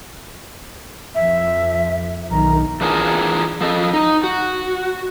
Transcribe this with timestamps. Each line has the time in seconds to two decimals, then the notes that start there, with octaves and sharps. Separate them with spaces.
1.15 F2 F3 E5
2.31 B1 D#3 A#5
2.81 E3 D4 F4 G#4 A#4
3.61 F3 A4 D#5
3.93 D#4
4.24 F#4